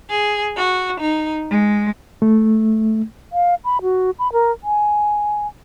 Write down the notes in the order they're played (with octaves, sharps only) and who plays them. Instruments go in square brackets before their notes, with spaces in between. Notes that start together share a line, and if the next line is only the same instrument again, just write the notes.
[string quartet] G#4
F#4
D#4
G#3
[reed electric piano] A3
[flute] F5
B5
F#4
B5
A#4
G#5